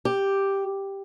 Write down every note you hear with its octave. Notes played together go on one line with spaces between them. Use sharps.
G4